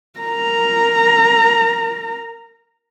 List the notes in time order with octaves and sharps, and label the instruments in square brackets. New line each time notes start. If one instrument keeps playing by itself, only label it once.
[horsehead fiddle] A#4 A#5